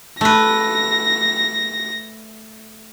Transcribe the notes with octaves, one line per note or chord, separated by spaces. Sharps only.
A3 B4 A#6